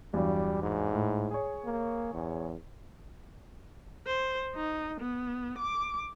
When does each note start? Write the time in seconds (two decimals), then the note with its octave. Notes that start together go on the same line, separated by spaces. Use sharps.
0.13 E2 G2 F#3 G3
0.62 G#2
0.93 A2
1.31 G#4 C#5
1.65 A#3
2.14 E2
4.06 C5
4.55 D#4
5.00 B3
5.58 D6